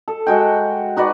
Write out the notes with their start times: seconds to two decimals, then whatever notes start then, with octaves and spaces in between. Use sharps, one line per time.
0.08 A4
0.27 G#3 F#4 G5
0.97 D#4 F#4 B4 D5